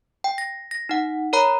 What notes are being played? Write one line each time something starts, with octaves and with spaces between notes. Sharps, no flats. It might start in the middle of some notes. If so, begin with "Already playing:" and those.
G5
A#6
A#6
D#4 F#5
A#4 C#5 A#5 B5